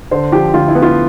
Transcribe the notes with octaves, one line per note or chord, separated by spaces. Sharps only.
D3 C5
F3 G4
D2 F4
E4
B3
F4